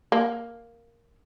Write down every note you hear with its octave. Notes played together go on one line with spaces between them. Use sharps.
A#3